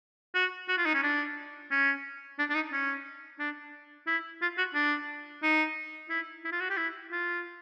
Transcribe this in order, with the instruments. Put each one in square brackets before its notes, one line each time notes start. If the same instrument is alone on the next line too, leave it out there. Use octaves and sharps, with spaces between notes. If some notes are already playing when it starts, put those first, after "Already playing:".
[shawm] F#4
F#4
F4
D#4
C#4
D4
C#4
D4
D4
D#4
C#4
D4
E4
F4
F#4
D4
D#4
E4
E4
F4
F#4
G4
E4
F4